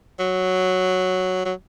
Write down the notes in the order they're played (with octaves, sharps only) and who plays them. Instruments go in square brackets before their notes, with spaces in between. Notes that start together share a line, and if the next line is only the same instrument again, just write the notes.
[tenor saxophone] F#3
F#3